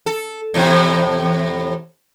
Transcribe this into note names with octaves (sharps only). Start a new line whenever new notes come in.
A4
E2 A2 C3